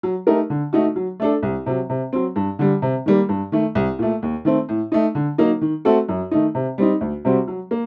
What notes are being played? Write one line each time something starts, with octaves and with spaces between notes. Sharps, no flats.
F#3
A3 D#4 G4 A#4
D3
A3 D#4 F#4
F#3
A3 D4 A4
C2
C3 F#3
C3
F#3 C4
G2
D3 G3
C3
D#3 G3 A#3
G2
D#3 A3
C2
A#2 A3
D#2
D#3 A3 C4
A2
A3 D#4
D3
F#3 A#3 D#4
D#3
A3 C4 F#4 A4
F#2
D#3 A3 D#4
C3
G3 C4 D#4
D2
C3 G3 C4 F#4
F#3
A#3